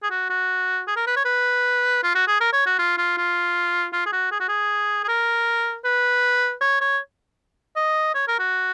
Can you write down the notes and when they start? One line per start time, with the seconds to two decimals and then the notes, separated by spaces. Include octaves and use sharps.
0.03 G#4
0.10 F#4
0.30 F#4
0.87 G#4
0.96 A#4
1.07 B4
1.16 C#5
1.25 B4
2.03 F4
2.15 F#4
2.27 G#4
2.40 A#4
2.53 C#5
2.66 F#4
2.78 F4
2.98 F4
3.17 F4
3.93 F4
4.06 G#4
4.12 F#4
4.31 G#4
4.40 F#4
4.48 G#4
5.04 G#4
5.08 A#4
5.84 B4
6.61 C#5
6.81 C#5
7.76 D#5
8.15 C#5
8.28 A#4
8.39 F#4